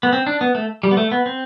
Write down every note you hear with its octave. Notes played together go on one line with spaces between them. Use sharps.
B3
C4
D4
B3
A3
G3
B3
A3
B3
C4